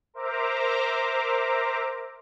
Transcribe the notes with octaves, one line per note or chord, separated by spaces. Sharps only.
A#4 C5 E5 A#5 D6